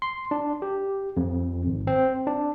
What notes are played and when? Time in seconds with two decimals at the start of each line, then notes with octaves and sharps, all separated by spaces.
0.02 C6
0.31 D4
0.62 G4
1.17 F2
1.66 G#1
1.87 C4
2.27 D4